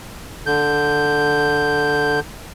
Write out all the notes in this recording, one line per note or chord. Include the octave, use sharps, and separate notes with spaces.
D3 G6